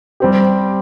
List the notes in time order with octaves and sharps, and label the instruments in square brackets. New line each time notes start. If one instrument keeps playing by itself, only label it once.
[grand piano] G3 C4 G4